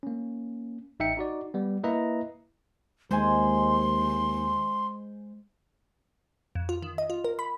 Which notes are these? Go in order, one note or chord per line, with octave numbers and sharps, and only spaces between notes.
A#3 C#4
A1 D#4 E5 G5 C#7
D#4 F#4 D5
G3 B3
A#3 E4 B4 D#5 E5 A#5
D#2 G#3 C5 G#5 C6
F2
F4
D#3
D#5
F4
A#4
B5